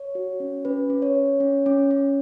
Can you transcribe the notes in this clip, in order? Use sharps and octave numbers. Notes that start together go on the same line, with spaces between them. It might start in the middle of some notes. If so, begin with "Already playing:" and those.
Already playing: C#5
F#4
C#4
C#4 B4
C#4
C#5
C#4
C#4
C#4
C#4